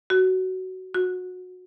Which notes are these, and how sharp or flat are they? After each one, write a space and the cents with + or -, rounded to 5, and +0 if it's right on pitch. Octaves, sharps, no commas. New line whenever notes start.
F#4 +15
F#4 -20